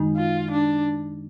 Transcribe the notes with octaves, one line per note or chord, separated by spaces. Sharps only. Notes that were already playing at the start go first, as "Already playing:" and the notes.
Already playing: F#2 D#3 G#3 D#4
F4
D4